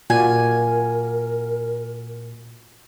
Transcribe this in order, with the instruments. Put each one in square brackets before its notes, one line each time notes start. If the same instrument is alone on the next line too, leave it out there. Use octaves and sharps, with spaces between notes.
[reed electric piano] A#2 [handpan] F4 F#4 D5 [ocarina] A#4 [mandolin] G#5